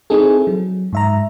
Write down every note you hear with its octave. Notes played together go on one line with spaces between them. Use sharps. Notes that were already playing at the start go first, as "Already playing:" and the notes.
C4 D#4 E4 G#4 A4
F#3
G#2 E5 A#5